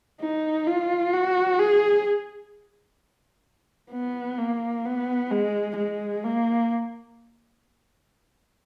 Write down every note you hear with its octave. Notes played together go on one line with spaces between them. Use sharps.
D#4
F4
F#4
G#4
B3
A#3
B3
G#3
G#3
A#3